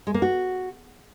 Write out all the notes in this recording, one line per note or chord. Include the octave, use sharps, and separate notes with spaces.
G#3
A#3
F#4